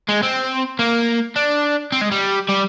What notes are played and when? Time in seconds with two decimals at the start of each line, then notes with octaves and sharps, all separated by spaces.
0.09 G#3
0.23 C4
0.79 A#3
1.36 D4
1.92 C4
2.01 G#3
2.11 G3
2.49 G3